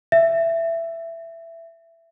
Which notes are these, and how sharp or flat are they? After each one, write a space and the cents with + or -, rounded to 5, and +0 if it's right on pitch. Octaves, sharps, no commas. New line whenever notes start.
E5 +10